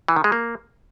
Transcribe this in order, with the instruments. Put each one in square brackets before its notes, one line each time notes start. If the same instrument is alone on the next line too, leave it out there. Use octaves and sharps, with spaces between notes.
[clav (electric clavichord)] E3
D#3
G#3
A#3